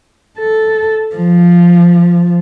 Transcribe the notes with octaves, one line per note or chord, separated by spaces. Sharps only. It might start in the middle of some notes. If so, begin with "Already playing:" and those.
A4
F3